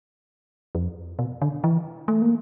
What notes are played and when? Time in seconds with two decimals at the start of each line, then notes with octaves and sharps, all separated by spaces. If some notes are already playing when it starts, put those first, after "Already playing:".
0.75 F2
1.19 B2
1.42 D3
1.64 E3
2.08 A3
2.22 A#3